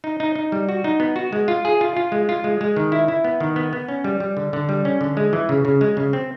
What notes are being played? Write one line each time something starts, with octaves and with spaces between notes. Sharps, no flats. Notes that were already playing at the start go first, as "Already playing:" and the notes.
D#4
D#4
D#4
G3
F#4
D#4
B3
F#4
G#3
F4
G#4
F4
F4
G#3
F4
G#3
G#3
D#3
E4
E4
B3
D#3
B3
B3
C#4
G3
G3
D3
D3
G3
C#4
D3
G#3
E3
C#3
C#3
G#3
C#3
C4